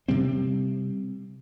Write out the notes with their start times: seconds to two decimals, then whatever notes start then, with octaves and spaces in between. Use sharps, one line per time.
0.08 C3 G3 C4